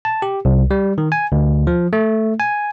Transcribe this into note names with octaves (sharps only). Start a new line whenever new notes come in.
A5
G4
C2
G3
D#3
G#5
D2
F3
A3
G#5